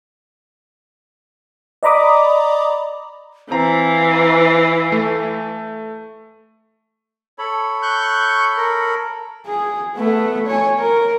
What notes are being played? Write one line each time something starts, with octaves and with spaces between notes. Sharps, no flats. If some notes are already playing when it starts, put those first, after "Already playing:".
D5 D#5 A#5 B5 D6 D#6
E3 C4 F5 A#5
A3
A4 C#5 B5
C#6 F#6 G6
A#4
G#4
A3 B3
C#5 G#5
A#4